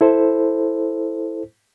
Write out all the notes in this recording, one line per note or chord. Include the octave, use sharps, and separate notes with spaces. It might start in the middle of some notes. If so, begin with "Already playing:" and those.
E4 A4 C5